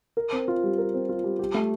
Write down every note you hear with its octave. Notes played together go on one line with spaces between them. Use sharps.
A#4
C4
F4
G3
A#4
C4
F4
G3
G4
A3